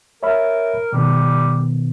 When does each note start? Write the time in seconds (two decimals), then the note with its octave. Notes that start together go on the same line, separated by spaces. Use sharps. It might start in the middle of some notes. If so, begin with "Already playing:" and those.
0.23 A#4 C#5 E5 B5
0.93 B2 D#3 G3 B3